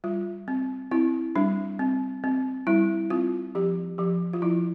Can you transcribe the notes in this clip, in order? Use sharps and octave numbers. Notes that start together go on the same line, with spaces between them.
G3 F4
C4
C4 E4
G3 D4
C4
C4
G3 E4
C4 F4
F3 G4
F3 G4
F4
F3 E4